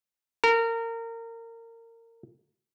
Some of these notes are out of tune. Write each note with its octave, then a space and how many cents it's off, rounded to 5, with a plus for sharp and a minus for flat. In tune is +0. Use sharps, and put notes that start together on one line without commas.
A#4 -25